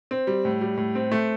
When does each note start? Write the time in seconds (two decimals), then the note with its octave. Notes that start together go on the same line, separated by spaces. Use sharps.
0.11 C4
0.27 G3
0.45 A2
0.61 G3
0.77 A2
0.95 C4
1.11 A3